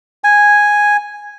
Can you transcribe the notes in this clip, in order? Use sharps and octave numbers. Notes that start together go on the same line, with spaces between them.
G#5